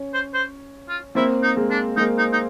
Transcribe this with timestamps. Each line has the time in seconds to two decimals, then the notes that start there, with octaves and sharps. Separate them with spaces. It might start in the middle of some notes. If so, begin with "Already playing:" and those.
Already playing: C#4
0.14 C5
0.34 C5
0.89 F4
1.15 A#3 C4 E4
1.43 D#4
1.56 G#3 A#3
1.71 D4
1.97 G#3 A#3 D#4
2.18 D#4
2.33 D#4